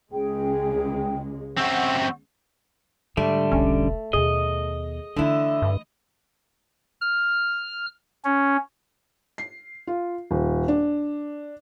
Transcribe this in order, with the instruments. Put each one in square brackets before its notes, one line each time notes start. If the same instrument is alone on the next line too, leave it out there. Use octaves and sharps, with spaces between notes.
[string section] C#2 G#3 [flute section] G#4 G5
[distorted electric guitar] F#2 C4 [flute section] F#5 C#6
[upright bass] G#2 [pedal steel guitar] D3 G3 [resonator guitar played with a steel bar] A3
[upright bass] E1 B1 [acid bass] C#4
[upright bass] D#2 B2 [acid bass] G#4 [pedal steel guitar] D#5
[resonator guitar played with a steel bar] D3 E4 [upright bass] E3 A3
[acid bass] G2
[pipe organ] F6
C#4
[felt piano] C7
F4
D#1
D4